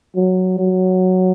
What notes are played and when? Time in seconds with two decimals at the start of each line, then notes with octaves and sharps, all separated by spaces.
0.16 F#3
0.59 F#3